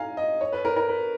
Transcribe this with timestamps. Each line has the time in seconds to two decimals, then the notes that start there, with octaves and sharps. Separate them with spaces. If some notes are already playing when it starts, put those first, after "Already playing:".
Already playing: F5 G#5 A#5
0.17 D#5
0.41 C#5
0.52 B4
0.65 A#4
0.76 A#4
0.88 B4